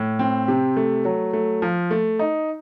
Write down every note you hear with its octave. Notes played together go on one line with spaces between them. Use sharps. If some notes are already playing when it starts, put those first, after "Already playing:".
Already playing: A2
C4
C3
A3
F#3
A3
F3
A3
D#4